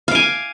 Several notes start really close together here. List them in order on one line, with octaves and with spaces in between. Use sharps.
F5 D6 G#5